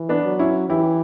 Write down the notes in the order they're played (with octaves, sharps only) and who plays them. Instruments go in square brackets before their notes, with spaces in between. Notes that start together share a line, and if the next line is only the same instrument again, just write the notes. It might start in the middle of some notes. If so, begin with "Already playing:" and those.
Already playing: [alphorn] E3
[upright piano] B3 D4
[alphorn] F#3
[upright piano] C#4 E4
[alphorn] E3 [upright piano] E4 G4